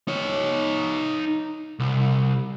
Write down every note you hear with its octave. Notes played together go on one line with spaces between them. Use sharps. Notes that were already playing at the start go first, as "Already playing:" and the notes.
D#4 C#5
C2